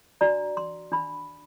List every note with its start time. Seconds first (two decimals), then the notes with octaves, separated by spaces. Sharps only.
0.21 D4 F#4 D5 A#5
0.57 C6
0.92 D4 B5